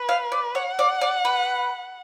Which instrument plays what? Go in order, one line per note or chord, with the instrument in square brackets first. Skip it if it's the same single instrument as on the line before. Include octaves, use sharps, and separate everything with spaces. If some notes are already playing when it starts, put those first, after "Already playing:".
Already playing: [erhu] B4
[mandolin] F5
D5
[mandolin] C#5 [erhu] F#5
[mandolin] D5
D5
B4